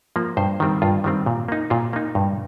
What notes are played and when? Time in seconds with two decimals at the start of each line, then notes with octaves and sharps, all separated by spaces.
0.16 F3 A#3
0.37 G2 C5
0.60 D#3 G3 C4
0.82 G2 F4
1.04 D#3 G3 C4
1.26 A#2
1.48 A#3 D#4
1.70 A#2 F4
1.93 A#3 D#4
2.15 G2